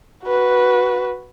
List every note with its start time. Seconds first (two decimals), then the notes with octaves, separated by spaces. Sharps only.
0.25 F#4 B4